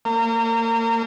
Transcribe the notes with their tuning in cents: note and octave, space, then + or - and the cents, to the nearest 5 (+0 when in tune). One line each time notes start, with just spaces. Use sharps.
A#3 -30